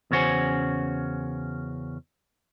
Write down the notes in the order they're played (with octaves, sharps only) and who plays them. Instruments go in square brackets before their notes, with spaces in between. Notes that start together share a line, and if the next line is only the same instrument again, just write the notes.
[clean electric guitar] E2 C#3 C#4 F#4 C5 G#5